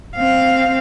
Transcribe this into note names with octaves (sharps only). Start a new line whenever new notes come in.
C4 F5